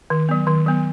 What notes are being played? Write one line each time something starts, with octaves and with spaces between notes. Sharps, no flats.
D#3
F#3 B3
D#3
F#3 B3